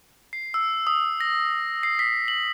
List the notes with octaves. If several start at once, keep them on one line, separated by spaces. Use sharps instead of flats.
C7
E6
D#6
A#6
C7
B6
F#7